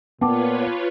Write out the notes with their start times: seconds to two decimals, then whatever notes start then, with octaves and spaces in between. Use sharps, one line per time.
0.21 A#2 B3 F4 B4 C#5 G5 A5 D6